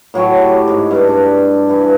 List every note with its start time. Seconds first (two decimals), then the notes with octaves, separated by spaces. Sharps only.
0.14 A2 F#3 G5 A5
0.40 G4
0.68 G#2
0.91 G2 D4
1.08 D4
1.69 E3